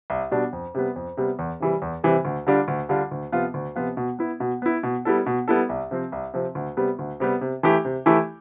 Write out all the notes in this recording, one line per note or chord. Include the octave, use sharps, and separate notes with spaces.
C2
B2 G3 D4
F2
C3 G3 B3
F2
C3 G3 B3
E2
C3 E3 G3
E2
C3 E3 G3
D2
D3 G3 D4 F4
D2
D3 G3 D4 F4
D2
C3 F3 B3 F4
D2
C3 F3 B3 F4
B2
B3 E4
B2
B3 E4
B2
G3 B3 E4 A4
B2
G3 B3 E4 A4
C2
C3 F3 C4
C2
C3 F3 C4
D2
C3 G3 B3
D2
C3 G3 B3
C3
E3 A3 E4 G4
C3
E3 A3 E4 G4